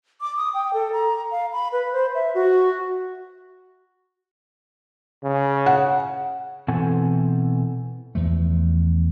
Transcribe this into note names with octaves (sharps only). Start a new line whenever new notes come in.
D6
D#6
G5
A4
A#5
F5
B5
B4
C5
E5
F#4
C#3
F#5
B2 E3 C4 A4 F#5 G#5
E2 F3 A3